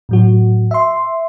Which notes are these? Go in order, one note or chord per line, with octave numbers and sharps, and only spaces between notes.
A2 F#3 F#4
E5 C6